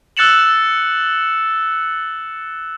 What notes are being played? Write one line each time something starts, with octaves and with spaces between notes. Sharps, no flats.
E6 F#6 A6 C#7 E7 F#7